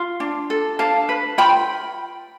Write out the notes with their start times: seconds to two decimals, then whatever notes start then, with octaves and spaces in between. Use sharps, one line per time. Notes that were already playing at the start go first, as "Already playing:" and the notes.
Already playing: F4
0.20 D4
0.50 A4
0.79 D4 F5 A5
1.09 B4
1.38 F4 G5 B5